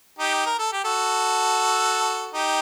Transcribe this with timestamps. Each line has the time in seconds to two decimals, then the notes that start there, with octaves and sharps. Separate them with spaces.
0.19 D#4 G4
0.46 A#4
0.59 A4
0.73 G4
0.85 F#4 A4
2.34 D#4 G4